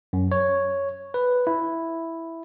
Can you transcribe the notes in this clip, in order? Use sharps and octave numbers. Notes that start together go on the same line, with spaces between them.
F#2
C#5
B4
E4